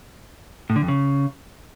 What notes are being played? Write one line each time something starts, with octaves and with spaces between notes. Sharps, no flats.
A2
D3
F2
C#3